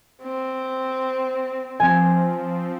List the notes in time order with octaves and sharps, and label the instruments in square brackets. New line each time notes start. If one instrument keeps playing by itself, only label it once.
[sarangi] C4
[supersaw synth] F3 C4 [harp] G#5